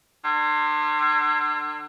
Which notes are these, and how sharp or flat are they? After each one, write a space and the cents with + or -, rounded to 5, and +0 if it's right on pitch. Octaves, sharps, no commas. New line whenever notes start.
D3 +40